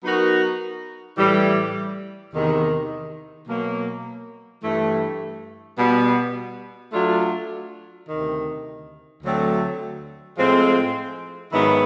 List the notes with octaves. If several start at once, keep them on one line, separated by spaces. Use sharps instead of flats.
F#3 B3 D#4 F#4 A#4
A2 E3 G3
E2 C3 D#3
B2 F#3 A#3
G2 E3 A3
B2 G3 B3
F#3 A3 D4 F4
D2 C3 D#3
D2 D3 F#3 A3 C4
A2 F3 G#3 C4
G#2 D#3 F#3 B3 E4